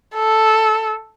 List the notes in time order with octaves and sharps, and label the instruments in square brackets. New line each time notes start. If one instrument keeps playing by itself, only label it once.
[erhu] A4